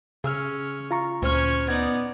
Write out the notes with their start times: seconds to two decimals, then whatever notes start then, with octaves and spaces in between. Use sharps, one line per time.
0.24 C#3 C#4 G#4 E6 F6
0.91 F4 A#5 C#6
1.22 D2 A#2 C#4 C5 C#5 F6
1.69 B3 D#4 D5 G#6